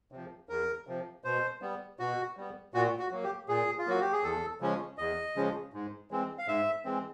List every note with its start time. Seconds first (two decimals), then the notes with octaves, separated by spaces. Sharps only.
0.12 C3 F3
0.49 E2 A#4
0.87 C3 F3
1.24 B2 C5
1.62 G3 B3
1.99 B2 F#4
2.37 G3 B3
2.74 A#2 F#4
2.99 F#4
3.11 F#3 A#3
3.23 G4
3.48 A#2 G#4
3.78 F4
3.86 F#3 A#3 F#4
4.01 G4
4.12 G#4
4.23 E2 A4
4.60 C#3 F3 G#3 C#4
4.98 E2 D#5
5.36 C#3 F3 G#3 C#4
5.73 G#2
6.11 E3 G#3 C4
6.38 F5
6.48 G#2 E5
6.85 E3 G#3 C4